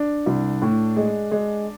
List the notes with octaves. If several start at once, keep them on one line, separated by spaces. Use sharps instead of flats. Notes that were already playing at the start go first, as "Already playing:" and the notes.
Already playing: D4
C2
A2
G#3
G#3